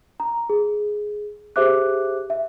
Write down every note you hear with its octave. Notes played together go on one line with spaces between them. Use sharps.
A#5
G#4
G4 G#4 C5 E5 D6 F#6
E5